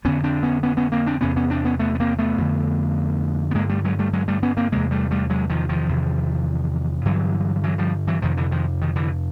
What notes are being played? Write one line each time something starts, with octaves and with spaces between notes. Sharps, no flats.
F2 D3 B3 C#4
C4 D4
B3 C#4
B3 C#4
B3 C#4
A#3 C4
C4 D4
E2 C3 B3 C#4
B3 C#4
C4 D4
B3 C#4
A3 B3
B3
A#3 C4
A3 B3
F2 D3
B3
G2 D3 G#3 A#3
G3 A3
F#3 G#3
G3 A3
F#3 G#3
G3 A3
B3 C#4
A#3 C4
E2 C3 G#3 A#3
G3 A3
G3 A3
F#3 G#3
D#3 F3
D#3 F3
E2 C3
G2 D3 E3 F#3
E3 F#3
F3 G3
E3 F#3
F2 C3 D#3 F3
D3 E3
D#3 F3
D#3
D3 E3